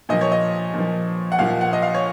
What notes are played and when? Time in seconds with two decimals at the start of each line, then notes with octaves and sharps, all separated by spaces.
0.09 A#2 F3 D#5
0.21 C#5
0.32 D#5
0.74 A#2 F3
1.32 F#5
1.39 A#2 F3 F5
1.61 F#5
1.73 D#5
1.82 F5
1.94 C#5